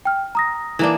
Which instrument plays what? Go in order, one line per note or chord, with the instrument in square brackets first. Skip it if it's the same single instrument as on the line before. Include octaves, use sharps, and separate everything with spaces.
[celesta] G5 F6
A#5 D#6 A#6
[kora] E3 A#3 D4